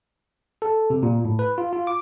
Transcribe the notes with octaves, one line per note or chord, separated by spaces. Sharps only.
A4
C3
A#2
A2
B4
F4
F4
D6